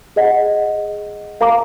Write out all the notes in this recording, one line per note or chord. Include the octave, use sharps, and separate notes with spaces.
G#4 D#5 F#5
A#4 F5 A#5 D6